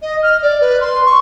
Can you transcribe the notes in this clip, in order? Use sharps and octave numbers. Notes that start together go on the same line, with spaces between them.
D#5
F6
D5
B4
C6
C#6